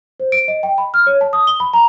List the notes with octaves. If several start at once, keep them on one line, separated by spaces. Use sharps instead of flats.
C5
D7
D#5
G5
B5
F6
C#5
A5
D#6
G7
B5
A#5